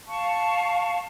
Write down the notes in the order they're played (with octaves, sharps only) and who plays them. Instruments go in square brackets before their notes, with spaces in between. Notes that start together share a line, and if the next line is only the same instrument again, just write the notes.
[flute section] F5 A5 C#6